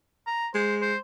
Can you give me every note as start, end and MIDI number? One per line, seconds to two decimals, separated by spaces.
0.27 0.48 82
0.55 0.94 56
0.55 0.76 72
0.81 0.98 72